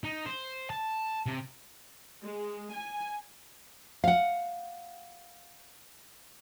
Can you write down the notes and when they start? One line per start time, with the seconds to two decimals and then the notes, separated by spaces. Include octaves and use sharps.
0.04 D#4
0.26 C5
0.70 A5
1.26 C3
2.21 G#3
2.73 G#5
4.04 F5 F#5